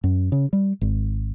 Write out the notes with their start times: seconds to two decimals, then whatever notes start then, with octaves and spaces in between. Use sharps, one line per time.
0.04 F#2
0.32 C#3
0.53 G3
0.81 G#1